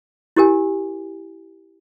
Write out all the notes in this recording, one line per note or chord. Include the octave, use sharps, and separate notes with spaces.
E4 G4 A#4 G#5